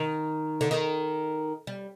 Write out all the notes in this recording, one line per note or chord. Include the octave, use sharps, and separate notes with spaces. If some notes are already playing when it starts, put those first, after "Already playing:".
Already playing: D#3
D3
D#3
G3